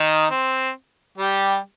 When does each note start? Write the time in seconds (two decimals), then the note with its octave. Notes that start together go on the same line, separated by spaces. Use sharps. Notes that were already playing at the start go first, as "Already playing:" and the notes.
Already playing: D#3 D#4
0.30 C4
1.18 G3 G4